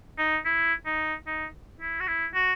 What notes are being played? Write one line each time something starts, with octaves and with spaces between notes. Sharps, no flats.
D#4
E4
D#4
D#4
E4
F#4
E4
F#4